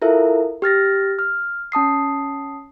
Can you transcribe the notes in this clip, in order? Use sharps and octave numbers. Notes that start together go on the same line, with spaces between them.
E4 F4 A4 A#4 E5
G4 F6 A6 A#6
F6
C#4 A5 D#6 C7